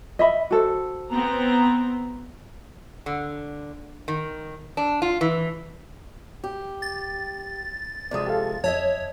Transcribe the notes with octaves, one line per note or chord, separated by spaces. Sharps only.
D#5 E5 B5
F#4 A4 C5
B3 C4 A#5
D3
D#3
D4
F4
E3
G4
A6
C3 F3 G#3 D5 D#6
G4 A4 F5
F2 C#5 D#5 E5 A5